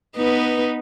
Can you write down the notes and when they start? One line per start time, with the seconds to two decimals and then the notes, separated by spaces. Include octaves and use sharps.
0.17 B3 D#4 B4